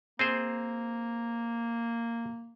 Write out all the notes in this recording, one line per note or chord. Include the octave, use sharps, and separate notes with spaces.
A#3 C4 G#4 C5